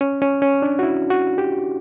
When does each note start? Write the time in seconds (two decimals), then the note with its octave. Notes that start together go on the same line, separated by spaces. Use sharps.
0.01 C#4
0.22 C#4
0.42 C#4
0.62 D4
0.79 F#4
0.83 E4
1.10 F#4
1.38 G4